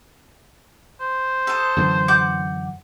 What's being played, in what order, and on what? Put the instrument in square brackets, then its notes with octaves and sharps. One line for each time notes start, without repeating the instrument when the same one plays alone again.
[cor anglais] C5
[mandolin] A4 D#6
[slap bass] F#2 D3 E3
[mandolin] F#5 D6 G6